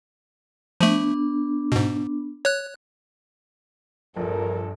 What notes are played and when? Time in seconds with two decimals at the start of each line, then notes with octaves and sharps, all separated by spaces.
0.81 F3 A3 B3 D4
1.72 G#2 B2
2.45 C#5 F#6
4.16 A#1 E2 G2 F3 A4 A#4